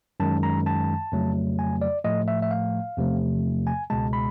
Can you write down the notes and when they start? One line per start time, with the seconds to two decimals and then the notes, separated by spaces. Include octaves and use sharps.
0.20 F#2 D#3 G#3 A5
0.43 A#5
0.66 A5
1.12 F2 C#3 F#3 A3
1.59 G#5
1.82 D5
2.05 A2 F3 A3 D#5
2.28 E5
2.42 E5
2.51 F5
2.97 E2 C3 F3 A3
3.67 G#5
3.90 C#2 B2 G#3 A5
4.13 B5